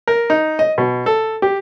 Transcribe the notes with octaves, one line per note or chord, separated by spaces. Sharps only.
A#4
D#4
D#5
B2
A4
G4